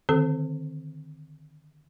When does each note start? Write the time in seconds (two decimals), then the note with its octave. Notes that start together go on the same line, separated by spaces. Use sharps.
0.09 D3 D#3 C4 A4